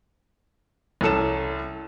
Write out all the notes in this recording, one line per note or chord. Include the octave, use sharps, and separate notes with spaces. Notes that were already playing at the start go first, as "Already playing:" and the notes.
C2 C#4 A4 E7